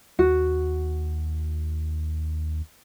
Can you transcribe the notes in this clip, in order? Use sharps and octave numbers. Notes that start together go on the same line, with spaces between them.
D#2 F#4